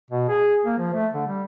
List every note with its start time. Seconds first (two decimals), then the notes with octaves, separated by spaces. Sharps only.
0.11 B2
0.29 G#4
0.65 A#3
0.78 F3
0.93 A3
1.13 D3
1.27 G3